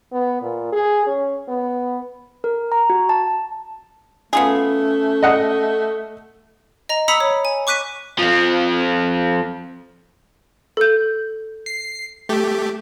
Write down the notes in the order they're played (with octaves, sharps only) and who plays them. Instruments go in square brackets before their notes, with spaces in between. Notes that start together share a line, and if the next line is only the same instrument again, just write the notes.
[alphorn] B3
A#2
G#4
C#4
B3
[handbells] A#4
A#5
F#4
A5
[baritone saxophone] A3 [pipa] B3 F4 G#4 [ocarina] C#4
[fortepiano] D#5 F#5
[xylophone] D#5 A#5
A#5 B5 D#6 E6 B6 C#7
C#5
G#5
C#6 D6 F#6 B6 D#7
[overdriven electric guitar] F3 C4
[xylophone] A4 G6
[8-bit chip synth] C7
A3 G4